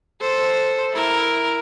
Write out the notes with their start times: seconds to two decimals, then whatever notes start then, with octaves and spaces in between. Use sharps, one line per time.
0.20 A4 C5
0.93 E4 A#4